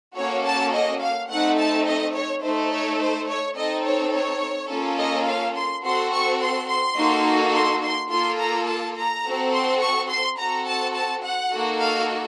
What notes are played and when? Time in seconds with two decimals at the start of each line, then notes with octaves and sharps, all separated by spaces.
0.16 A#3 C#4 F#4 A4 C#5
0.45 A5
0.73 D#5
1.01 F5
1.30 A3 C4 D#4 A4 F#5
1.58 A5
1.86 D#5
2.14 C#5
2.43 A3 D#4 A4 C5
2.71 C#5
3.00 C5
3.28 C#5
3.56 C4 D#4 A4 D#5
3.85 C#5
4.13 C#5
4.70 A#3 C#4 F4 A4
4.98 D#5
5.27 F5
5.55 C6
5.83 C4 F#4 A4 C6
6.12 C#6
6.41 C6
6.69 C6
6.97 A#3 D#4 F#4 A4
7.54 C6
7.82 C6
8.11 A#3 F4 A4 C6
8.39 A#5
8.67 A5
8.96 A#5
9.25 C4 F#4 A4
9.53 C6
9.81 C#6
10.09 C6
10.38 C4 F#4 A4 A#5
10.67 A5
10.94 A5
11.23 F#5
11.52 A#3 D#4 F#4 A4
11.79 F5